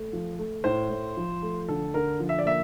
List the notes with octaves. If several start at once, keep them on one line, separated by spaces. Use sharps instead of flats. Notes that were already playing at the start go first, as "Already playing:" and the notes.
Already playing: A3
F3
A3
A2 C5
A2
F3
A3
D3 A4
D3 A#4
F3
E5
D5
A#3 E5